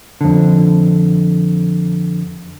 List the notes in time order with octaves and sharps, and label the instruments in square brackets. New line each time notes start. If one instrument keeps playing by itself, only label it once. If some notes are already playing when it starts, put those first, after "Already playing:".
[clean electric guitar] F2 D3